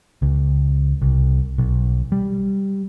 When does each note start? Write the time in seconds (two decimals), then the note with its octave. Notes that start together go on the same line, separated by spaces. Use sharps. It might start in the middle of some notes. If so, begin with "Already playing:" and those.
0.22 C#2
1.02 C2
1.58 B1
2.12 G3